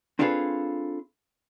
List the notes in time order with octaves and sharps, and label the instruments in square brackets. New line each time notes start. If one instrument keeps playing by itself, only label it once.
[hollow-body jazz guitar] C4 D4 F4 G#4 A4 B4